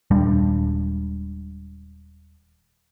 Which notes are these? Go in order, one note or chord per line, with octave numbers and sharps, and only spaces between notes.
D#1 G3 G#3 D4